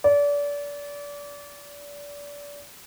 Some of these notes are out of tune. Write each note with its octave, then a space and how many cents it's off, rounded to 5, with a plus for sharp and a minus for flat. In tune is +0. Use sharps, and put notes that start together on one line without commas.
D5 -30